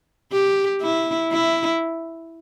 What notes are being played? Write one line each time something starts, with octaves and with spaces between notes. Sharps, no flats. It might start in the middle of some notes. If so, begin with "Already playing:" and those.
G4
E4
E4